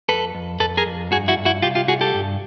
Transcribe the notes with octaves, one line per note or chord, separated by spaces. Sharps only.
F2 A4 B4
F2
F2 A4 B4
G#4 A#4
F2
G2 F#4 G#4
E4 F#4
G2
E4 F#4
C2 F4 G4
F4 G4
C2 F#4 G#4
G4 A4
G2